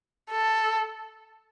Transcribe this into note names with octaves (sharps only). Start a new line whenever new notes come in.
A4